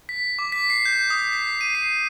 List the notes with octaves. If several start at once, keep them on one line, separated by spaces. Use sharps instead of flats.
B6
D6
B6
C7
G6
D#6
B6
D#7
C7